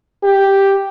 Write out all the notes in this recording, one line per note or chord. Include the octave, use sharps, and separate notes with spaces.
G4